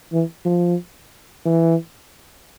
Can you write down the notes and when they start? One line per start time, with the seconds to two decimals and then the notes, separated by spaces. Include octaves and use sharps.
0.13 E3
0.45 F3
1.45 E3